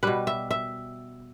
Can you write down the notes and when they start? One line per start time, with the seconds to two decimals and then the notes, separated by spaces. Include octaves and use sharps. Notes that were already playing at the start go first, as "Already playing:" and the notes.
0.03 B2 G3 B4
0.27 E5
0.51 E5